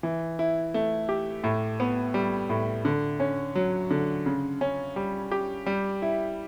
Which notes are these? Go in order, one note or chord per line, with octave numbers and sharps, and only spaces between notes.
E3
E4
A3
G4
A2
B3
G3
A2
D3
C#4
F#3
D3
C#3
C#4
G3
G4
G3
E4